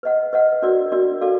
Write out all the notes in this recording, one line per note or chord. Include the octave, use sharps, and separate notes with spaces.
B4 D#5 F#5
B4 D#5 F#5
D4 F#4 A#4 D5
D4 F#4 A#4 D5
F#4 A4 D5 F5